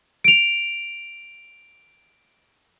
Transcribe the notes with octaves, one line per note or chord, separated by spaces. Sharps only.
D7 F7